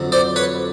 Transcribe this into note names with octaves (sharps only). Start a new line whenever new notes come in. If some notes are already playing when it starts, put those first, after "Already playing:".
Already playing: F2 D3 F#3
C5 D5
B4 C#5